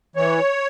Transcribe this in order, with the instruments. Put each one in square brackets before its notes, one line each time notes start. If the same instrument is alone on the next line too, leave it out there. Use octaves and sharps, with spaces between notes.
[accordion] E3 C#5